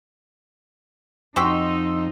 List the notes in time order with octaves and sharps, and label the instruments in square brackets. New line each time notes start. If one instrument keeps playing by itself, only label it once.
[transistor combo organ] F2 [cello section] D#4 [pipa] F#4 G4 G5 [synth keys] C6 E6